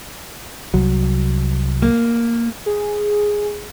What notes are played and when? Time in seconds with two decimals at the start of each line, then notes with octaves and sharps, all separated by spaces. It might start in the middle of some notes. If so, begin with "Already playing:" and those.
0.74 C2 F#3
1.82 A#3
2.66 G#4